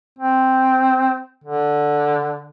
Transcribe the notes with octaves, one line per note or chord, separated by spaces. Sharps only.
C4
D3